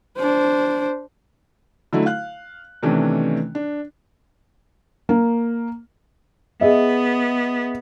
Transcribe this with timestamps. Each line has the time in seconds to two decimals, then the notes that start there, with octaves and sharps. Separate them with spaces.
0.18 D4 C5
1.93 D3 F#3 A3 D#4 E4
2.06 F5 F#6
2.83 C3 D#3 E3 A3 C#4 D4
3.55 D4
5.09 A#3
6.61 B3 G#4 D#5 E5